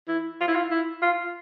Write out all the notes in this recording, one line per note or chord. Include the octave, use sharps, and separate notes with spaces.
E4
F4
E4
F4
E4
F4